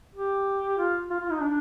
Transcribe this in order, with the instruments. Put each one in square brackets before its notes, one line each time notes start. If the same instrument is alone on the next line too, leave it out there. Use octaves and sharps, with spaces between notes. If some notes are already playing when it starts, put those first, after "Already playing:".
[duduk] G4
F4
F4
F4
D#4
D4